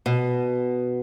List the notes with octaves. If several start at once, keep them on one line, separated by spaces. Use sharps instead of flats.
B2